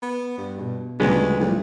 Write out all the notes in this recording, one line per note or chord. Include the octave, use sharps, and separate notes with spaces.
B3
G2
B2
D2 C#3 F3 G3 G#3 B3 C#4
A1 D2 G3 F4